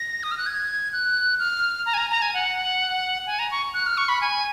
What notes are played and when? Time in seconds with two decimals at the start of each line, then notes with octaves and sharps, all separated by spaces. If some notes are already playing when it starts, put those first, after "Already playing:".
Already playing: A#6
0.23 D#6
0.31 F6
0.38 F#6
0.46 G#6
0.93 F#6
1.39 F6
1.86 A#5
1.94 G#5
1.98 A#5
2.11 A#5
2.22 G#5
2.34 F#5
3.27 G#5
3.39 A#5
3.51 C#6
3.74 F#6
3.86 F6
3.98 C#6
4.09 B5
4.21 G#5